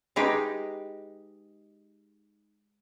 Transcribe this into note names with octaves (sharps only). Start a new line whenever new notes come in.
G#3 D#4 G4 B4